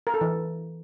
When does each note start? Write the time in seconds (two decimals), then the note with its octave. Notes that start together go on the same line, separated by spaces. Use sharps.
0.07 A#4
0.14 A4
0.21 E3